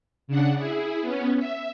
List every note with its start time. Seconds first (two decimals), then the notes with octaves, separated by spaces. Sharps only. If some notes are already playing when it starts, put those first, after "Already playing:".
0.28 C#3 D4 F#5
0.57 E4 G#4
1.01 B3 C#4
1.39 E5